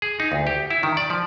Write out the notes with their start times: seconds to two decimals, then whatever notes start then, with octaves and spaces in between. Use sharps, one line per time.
0.02 G#4
0.20 D#4
0.32 D2
0.47 G4
0.71 E4
0.83 D#3
0.97 D5
1.10 F3